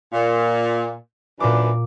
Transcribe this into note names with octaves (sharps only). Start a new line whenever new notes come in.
A#2
F#2 A#2 E3 D4 D6